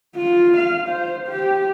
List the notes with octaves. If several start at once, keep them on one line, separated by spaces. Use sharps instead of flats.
F4
F5
C5
G4